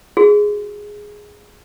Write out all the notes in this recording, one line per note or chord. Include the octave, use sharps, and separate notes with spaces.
F#4 G#4